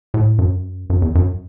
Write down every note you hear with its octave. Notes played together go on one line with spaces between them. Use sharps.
A2
F#2
F#2
E2
F#2